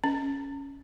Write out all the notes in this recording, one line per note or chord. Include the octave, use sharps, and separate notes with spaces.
C#4